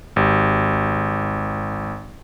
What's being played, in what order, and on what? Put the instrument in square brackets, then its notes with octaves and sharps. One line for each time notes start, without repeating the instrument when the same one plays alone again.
[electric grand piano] G#1 G4